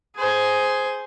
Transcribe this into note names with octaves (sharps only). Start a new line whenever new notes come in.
G#4 C5